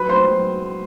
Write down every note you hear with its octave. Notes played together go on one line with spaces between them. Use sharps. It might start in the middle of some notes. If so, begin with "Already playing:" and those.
Already playing: F#3 B4 B5
B3 C5 C6
F#3